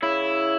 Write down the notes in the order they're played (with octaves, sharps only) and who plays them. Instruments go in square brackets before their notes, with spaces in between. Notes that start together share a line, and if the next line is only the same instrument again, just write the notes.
[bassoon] C#3 [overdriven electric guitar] E4